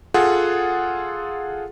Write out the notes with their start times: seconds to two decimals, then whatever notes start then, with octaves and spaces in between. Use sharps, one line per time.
0.14 F4 G#4 A4 F#5